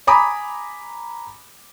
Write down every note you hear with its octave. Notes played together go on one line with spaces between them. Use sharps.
G#5 A#5 B5 D6 D#6